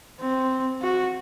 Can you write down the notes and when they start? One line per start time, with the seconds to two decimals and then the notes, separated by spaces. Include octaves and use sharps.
0.20 C4
0.82 F#4